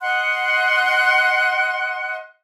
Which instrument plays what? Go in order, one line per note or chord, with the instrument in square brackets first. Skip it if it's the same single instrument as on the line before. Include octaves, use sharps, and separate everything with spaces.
[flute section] D#5 F#5 C6 F#6